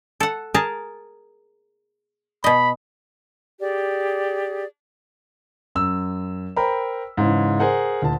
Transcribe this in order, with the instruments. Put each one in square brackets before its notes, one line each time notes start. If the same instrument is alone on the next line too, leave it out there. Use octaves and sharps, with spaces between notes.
[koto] A4 F#5
G#4 A#4 A5
[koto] B2 D#5 [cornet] B5
[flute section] G4 G#4 D5
[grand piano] F#2 E6
A#4 C5 G5 A#5 B5
G#2 C#3 E3
G#4 A#4 C5 F#5
D2 A#2 A5